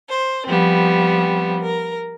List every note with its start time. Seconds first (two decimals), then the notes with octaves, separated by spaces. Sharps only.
0.10 C5
0.48 F3 G3 B3 C4
1.62 A#4